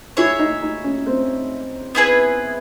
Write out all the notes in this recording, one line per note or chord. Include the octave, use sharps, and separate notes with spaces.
E4 G#4 C#5 E5
D#4
D#4
C#4
C4
B3 E4 G#4 B4